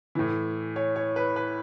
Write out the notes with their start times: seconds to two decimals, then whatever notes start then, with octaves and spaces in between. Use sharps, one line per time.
0.15 A2 E3
0.76 C#5
0.96 C#5
1.16 B4
1.36 B4